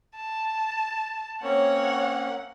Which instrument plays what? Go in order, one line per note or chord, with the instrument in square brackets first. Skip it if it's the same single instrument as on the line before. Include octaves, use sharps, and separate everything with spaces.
[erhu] A5
[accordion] A#3 C4 C#4 [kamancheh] C#5 [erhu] F#5